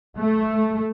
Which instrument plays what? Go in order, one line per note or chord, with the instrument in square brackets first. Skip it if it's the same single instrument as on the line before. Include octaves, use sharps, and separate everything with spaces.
[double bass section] A3